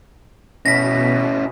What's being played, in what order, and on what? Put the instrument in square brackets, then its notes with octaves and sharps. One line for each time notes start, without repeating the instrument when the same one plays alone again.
[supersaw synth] B2 [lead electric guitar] C#4 E4 [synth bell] A#6 B6